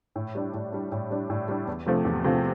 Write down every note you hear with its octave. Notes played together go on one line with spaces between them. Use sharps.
A2
G3 D4
A2
G3 D4
A2
G3 D4
A2
G3 D4
E2
C3 F3 A3
E2
C3 F3 A3